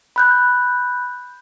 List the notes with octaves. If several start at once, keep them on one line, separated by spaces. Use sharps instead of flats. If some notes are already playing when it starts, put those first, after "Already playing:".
B5 F#6 G6